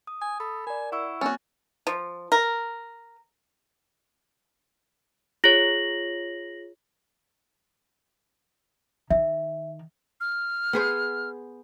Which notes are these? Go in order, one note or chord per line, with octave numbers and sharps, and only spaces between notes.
D#6
G#5 D#6
A4 B5
A#4 D5 G#5
E4 F#5 C#6 E6
A#3 C4 C#4 F#4 A6
F3
A#4
F4 G#4 C#5 A#6 F#7
D#3 E5
F6
B3 G#4 C5